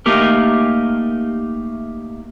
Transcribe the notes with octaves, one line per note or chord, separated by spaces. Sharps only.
A3 A#3 D#4 G4 A#4